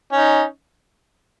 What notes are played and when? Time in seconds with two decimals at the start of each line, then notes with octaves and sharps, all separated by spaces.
0.12 C#4 D#4